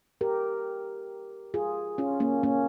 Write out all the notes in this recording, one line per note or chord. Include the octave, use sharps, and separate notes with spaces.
G4 A#4
F4 G#4
C#4 F4
A#3 C#4
A#3 C#4